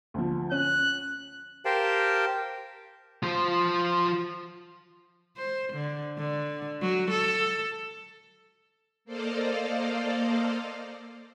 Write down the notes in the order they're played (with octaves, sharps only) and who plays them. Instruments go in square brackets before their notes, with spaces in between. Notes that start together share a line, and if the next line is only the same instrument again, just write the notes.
[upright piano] D2 F3
[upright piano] C#4 [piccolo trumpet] F#6
[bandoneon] G4 A#4 C5 F5 G5 A5
[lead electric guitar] F3 C5
[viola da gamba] C5
D3
D3
F#3
A4
[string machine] A#3 A4 C5 D5 D#5 F5